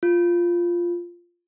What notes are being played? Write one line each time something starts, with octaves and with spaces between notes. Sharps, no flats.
F4